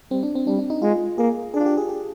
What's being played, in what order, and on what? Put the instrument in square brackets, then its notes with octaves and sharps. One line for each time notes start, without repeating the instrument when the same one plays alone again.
[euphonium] G3 [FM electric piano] C4
[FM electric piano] D4
C4
[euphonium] G3 [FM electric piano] D4
[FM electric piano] D4
D#4
[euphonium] G#3 [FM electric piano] F4
[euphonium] A#3 [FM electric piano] G#4
[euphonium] D4 [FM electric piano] G#4
[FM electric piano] F4
G4
G#4
G4